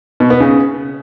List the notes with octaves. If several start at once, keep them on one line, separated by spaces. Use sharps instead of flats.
B2
B3
C#3